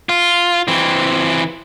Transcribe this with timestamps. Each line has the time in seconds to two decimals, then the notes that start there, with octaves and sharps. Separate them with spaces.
0.09 F4
0.68 E3 C4